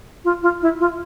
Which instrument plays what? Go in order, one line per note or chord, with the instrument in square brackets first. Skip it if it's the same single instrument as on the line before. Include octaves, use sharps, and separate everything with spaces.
[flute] F4
F4
E4
F4